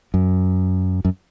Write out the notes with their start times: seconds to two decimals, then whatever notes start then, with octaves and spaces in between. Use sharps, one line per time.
0.14 F#2
1.05 F#2